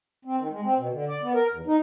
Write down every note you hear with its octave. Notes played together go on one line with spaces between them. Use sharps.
C4
D#3
G#3
C4
B2
D3
D5
B3
A#4
E2
D#4